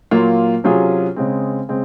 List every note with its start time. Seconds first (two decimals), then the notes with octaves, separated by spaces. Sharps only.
0.11 A#2 F#3 A#3 F4
0.64 C3 F#3 C#4 F4 G#4
1.16 C#3 G#3 C4
1.69 C#3 G#3 C4